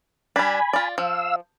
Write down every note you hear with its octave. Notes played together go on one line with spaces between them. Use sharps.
G3 D4 G#5 B5
F4 D5
F3 F5 E6